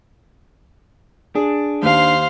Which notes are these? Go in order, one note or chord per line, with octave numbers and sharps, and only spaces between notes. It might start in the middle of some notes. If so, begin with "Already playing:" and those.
D4 G#4
D#2 C5 F5